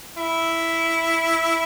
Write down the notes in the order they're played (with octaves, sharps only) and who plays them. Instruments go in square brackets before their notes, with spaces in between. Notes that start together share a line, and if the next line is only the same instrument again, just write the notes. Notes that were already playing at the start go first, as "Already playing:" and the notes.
[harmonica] E4